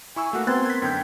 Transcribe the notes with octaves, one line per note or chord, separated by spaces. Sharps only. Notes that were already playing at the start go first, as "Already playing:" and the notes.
E4 G#5 C#6 E6
A3 A#3 F#4
B3 C4 A#4 C6 F#6 G#6 A6
G#6 B6
F#2 D3 G5 G6